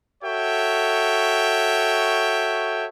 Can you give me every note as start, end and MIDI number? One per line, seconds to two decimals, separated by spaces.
0.24 2.86 66
0.24 2.86 69
0.24 2.86 73
0.24 2.86 76
0.24 2.86 79